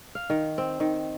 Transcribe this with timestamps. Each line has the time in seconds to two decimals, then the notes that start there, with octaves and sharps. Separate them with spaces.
0.15 F5
0.30 D#3
0.58 C4
0.80 D#3